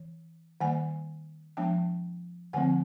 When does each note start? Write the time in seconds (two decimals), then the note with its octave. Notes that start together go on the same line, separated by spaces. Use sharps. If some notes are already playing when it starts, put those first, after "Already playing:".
Already playing: E3
0.61 D#3 G3 A#3 F#5 G#5
1.57 F3 G#3 B3 D4 G5 A5
2.53 D3 F3 A3 C4 F#5 G#5